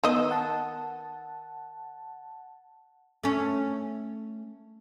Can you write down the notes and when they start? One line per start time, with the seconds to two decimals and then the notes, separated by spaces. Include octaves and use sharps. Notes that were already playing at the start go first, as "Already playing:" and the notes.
0.04 D#3 B3 D#5 E6
0.31 F#5 A5
3.24 A3 C#4